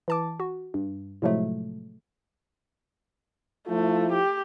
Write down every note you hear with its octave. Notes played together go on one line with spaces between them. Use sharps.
E3 A5 D6
F#4
G2
A2 C3 F3 F#3 G#3 A3
F3 A3 E4 F4
G4